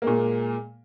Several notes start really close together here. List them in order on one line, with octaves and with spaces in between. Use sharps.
A#3 G#3 A#2